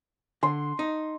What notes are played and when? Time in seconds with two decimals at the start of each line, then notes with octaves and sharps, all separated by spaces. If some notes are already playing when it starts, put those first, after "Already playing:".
0.43 D3 C6
0.79 D#4